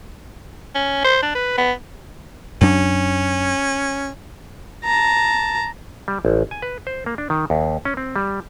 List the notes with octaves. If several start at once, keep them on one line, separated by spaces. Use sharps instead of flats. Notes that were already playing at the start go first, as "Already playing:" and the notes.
C#4
C5
D4
B4
B3
F#2 F#3 C#4 D4
A5 A#5
G3
A1
G#5
B4
C5
A#3
D4
D#3
D#2
C#4
C4
G3